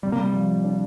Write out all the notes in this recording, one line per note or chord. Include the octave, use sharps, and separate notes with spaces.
C3 G3
A#3
G3
F3
D4